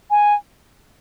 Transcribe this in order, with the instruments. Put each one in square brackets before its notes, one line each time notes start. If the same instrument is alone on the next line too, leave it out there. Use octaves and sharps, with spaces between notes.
[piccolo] G#5